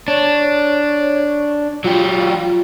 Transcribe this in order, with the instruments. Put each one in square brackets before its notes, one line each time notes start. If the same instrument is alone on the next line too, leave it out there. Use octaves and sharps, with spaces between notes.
[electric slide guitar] D4 [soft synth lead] C#5
[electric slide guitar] F#3 G4 [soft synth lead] F4